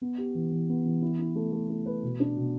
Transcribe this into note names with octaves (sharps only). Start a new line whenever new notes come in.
B3
G4
E3
E3
B3
E3
E4
E4
A3
A3
A3
B4
B2
D4
B2